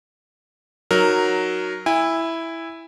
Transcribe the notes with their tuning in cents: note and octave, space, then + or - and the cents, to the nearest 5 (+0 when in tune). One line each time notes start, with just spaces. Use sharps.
F#3 +0 D#4 +0 A#4 +0
E4 +0 G#5 -35